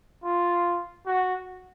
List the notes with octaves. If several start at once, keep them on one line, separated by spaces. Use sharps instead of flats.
F4
F#4